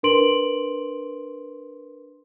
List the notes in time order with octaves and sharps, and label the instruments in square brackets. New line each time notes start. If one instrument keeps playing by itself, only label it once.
[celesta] D4 A#4 B4 C6 D7 F#7